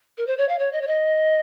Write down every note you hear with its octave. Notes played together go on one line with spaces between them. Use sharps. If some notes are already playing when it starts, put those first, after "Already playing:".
A#4
C5
C#5
F5
C#5
D#5
C#5
D#5